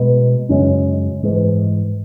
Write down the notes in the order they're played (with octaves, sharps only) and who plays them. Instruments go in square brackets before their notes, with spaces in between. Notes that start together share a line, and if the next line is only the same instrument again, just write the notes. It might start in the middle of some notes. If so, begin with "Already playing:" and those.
Already playing: [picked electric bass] B2 G#3 B3
F#2 C#3 G#3 C#4
G#2 E3 G#3